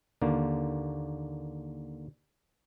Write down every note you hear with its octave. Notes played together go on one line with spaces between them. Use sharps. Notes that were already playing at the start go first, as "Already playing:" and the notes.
D#2 D3 A#3